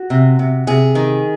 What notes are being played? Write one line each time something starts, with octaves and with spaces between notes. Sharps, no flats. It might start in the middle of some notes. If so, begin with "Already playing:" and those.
Already playing: F#4
C3
C3
C3 G#4
D#3